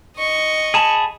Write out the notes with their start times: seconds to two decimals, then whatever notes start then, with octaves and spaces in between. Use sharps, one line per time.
0.18 D#5 C#6
0.74 G#4 A5 B5